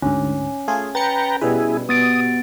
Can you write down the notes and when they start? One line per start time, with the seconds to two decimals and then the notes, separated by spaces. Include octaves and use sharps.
0.02 D2 G#2 C#4
0.68 A3 F4 G#4
0.95 B4 G5 A#5 A6 C#7
1.41 B2 G3 E4 G#4 B4
1.89 B3 D#6 A6 D7